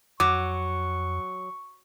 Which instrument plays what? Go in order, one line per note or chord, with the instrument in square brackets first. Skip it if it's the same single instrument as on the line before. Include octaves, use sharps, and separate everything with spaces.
[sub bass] F2 [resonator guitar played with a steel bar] F#3 [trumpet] C#6 [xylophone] D6